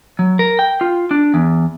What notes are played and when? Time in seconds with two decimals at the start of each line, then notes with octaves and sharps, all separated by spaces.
0.19 F#3
0.39 A#4
0.59 G5
0.81 F4
1.11 D4
1.34 E2